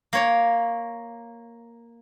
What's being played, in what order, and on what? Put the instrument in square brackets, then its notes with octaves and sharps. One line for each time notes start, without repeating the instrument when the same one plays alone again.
[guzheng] A#3 C#5 A#5